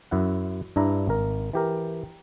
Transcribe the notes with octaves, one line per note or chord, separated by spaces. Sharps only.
F#2 E4 F#5
G2 D4 E4 A#5
G#1 A#4
E3 G4 A#4